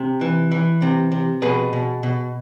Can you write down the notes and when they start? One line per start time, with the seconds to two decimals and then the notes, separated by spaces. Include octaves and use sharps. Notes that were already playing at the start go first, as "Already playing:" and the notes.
Already playing: C3
0.21 E3
0.52 E3
0.82 C3
1.12 C3
1.42 B2 G#4 B4
1.73 B2
2.03 B2